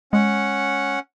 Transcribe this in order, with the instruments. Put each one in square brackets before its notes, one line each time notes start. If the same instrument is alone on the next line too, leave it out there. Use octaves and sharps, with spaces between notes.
[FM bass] G#3 [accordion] C#4 F#5